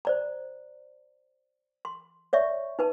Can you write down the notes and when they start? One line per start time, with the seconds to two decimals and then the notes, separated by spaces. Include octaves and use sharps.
0.05 C5 D5 A#5
1.85 C6
2.33 C#5 D5 E5 C#6
2.79 D#4 B4 A5